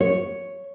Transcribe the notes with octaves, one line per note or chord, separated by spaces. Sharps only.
C#5